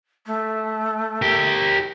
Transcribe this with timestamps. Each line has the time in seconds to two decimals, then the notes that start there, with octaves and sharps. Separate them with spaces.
0.27 A3
1.22 G4 A#4